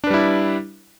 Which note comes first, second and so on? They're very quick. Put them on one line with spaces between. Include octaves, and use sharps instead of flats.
D4 B4 G3 E4